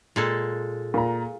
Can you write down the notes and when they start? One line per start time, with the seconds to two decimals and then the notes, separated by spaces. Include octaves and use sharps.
0.16 A#2 G#3 A4
0.94 A#2 A#5